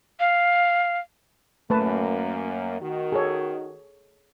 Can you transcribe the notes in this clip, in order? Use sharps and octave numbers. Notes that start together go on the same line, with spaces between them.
F5
F#2 A3 A#3 B4 A5
D#3 F#4
G#4 A4 C#5